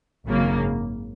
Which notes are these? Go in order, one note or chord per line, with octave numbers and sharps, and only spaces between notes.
G#1 F#2 C#3 F#3 A#3